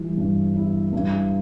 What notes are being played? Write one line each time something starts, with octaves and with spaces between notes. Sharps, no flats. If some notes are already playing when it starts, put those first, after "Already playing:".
Already playing: E3 G3
G2
E4
G2